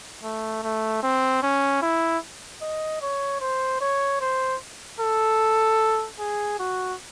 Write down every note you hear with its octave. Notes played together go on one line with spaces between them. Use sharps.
A3
A3
C4
C#4
E4
D#5
C#5
C5
C#5
C5
A4
G#4
F#4